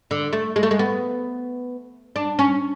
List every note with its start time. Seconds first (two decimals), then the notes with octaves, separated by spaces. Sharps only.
0.11 D3
0.33 A3
0.56 G#3
0.63 A3
0.71 G#3
0.79 B3
2.16 D4
2.39 C#4